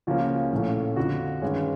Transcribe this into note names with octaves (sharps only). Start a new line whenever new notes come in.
C#2 C#3 F3 A#3 C#4 F#4
A#1 A2 F3 A3 C#4
F2 D3 F3 F#4
G2 D#3 G#3 C#4